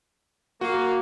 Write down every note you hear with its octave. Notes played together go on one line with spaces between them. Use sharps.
A#3 F#4